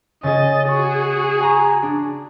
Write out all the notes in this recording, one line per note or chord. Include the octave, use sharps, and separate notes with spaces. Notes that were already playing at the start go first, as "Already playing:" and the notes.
C#3 G#4 D#5 A6
F#4 G#4 C#6
G#5 A#5 C#6
D4